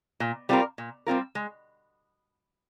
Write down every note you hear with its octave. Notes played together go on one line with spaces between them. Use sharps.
A#2
G3 C4 F4 A#4
A#2
G3 C4 F4 A#4
G#3